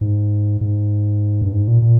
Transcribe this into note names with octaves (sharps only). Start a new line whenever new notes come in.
G#2
G#2
G2
G#2
A#2
A#2